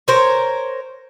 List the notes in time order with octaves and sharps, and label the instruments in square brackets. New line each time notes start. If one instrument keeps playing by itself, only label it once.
[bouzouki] A#4 C5 C#5